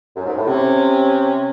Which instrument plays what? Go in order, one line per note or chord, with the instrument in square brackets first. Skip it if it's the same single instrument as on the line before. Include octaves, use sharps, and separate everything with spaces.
[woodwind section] F#2
G#2
A2
[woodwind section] C3 [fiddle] C#4